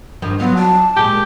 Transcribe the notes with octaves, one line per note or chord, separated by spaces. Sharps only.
G2 D#3 F3
F#3 B3 F4
A5
A#2 G#3 G4